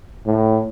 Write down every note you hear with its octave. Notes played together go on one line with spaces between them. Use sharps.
A2